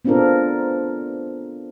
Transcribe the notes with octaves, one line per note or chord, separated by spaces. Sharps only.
B3 C4 D4 F4 A4 A#4